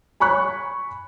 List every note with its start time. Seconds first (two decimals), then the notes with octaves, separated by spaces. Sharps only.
0.20 G#5 B5 C#6 F#6